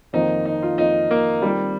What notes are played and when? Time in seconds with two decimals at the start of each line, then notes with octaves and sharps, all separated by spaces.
0.13 F2 D#3 A#3 D#4 F4 C5
0.45 D#4
0.62 F4
0.78 F2 D#3 A#3 D#4 F4 C5
1.11 A#3
1.42 D#3 G3 C4 F4 A#4